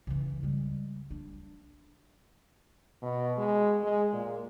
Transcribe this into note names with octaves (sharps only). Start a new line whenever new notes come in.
C#3 E3
G3 G#3
D4
B2
G#3
G#3
A#2